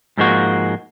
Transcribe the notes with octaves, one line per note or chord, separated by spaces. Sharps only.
G#2 F3 G#3 A#3 F#4